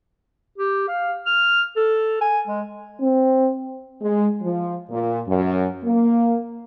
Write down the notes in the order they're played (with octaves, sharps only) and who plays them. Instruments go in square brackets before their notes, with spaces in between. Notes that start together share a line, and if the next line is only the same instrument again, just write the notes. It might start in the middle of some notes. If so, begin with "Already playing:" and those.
[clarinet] G4
F5
F6
A4
G#5
G#3
[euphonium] C4
[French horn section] G#3
F3
A#2
F#2
A#3